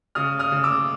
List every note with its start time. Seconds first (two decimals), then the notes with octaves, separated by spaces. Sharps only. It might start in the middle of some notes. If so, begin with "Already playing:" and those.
0.15 C#3 D#6 F6
0.39 D#6 F6
0.52 C#3
0.64 D6 E6